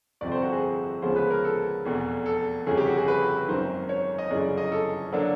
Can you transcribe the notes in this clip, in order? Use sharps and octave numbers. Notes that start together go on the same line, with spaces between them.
G1 F2 C3 D5
C5
F#4
G#4
D2 C#3 F3 G#3 B3 C5
B4
A#4
A4
F1 E2 B2
A4
G1 F2 C#3 G#4
G4
F#4
G#4
B4
G#1 F#2 D#3 C5
C#5
D#5
G1 F#2 C#3 E3 D5
D#5
A4
D3 F#3 A#3 D4